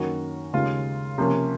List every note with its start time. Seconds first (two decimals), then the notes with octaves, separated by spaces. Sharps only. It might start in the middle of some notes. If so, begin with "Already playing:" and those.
Already playing: F#2 D#3 A#3 C#4 F#4
0.53 D#2 C#3 G#3 F4
1.18 C3 F3 A#3 C#4